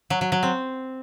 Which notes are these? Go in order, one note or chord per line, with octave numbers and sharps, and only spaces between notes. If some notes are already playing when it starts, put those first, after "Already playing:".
F#3
F#3
F#3
C4